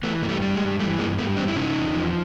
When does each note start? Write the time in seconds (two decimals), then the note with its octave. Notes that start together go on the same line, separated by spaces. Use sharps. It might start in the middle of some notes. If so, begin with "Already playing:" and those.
0.03 E3 A3 B3
0.22 G2 A#3
0.29 G3 A3
0.42 G3
0.55 G#3
0.62 G2
0.79 E3 G3 A3
0.99 G2 G#3 A#3
1.18 G3 A3 B3
1.37 G2 C4 D4
1.48 E4
1.56 C3 C#4 D#4
1.76 E2
1.94 F3